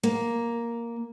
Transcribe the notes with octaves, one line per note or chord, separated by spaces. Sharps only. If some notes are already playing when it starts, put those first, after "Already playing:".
A#3